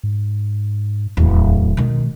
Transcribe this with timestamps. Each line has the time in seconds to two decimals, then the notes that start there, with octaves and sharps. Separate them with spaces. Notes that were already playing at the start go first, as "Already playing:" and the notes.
0.04 G#2
1.17 D1 E2
1.48 D#1
1.77 B2 D#3 G#3